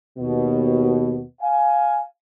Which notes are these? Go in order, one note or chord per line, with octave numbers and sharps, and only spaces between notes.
D#2 B2
F5 G#5